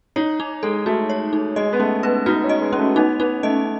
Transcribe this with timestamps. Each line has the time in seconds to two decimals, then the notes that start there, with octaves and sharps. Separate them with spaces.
0.16 D#4 C#5
0.40 D#4
0.63 G#3 A4
0.86 A3 F#4
1.10 C#5
1.33 D#4
1.56 G#3 D#5
1.73 B3
1.80 A3 C#4
2.03 B3 B4
2.26 D#4 F#4
2.44 C#4
2.49 D#5
2.61 G#3
2.73 C#4
2.78 A3
2.96 B3 D#4
3.20 B3 D#4
3.43 A3 D#5